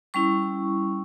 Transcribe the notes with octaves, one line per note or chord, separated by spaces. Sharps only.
G3 C#4 E4 C#6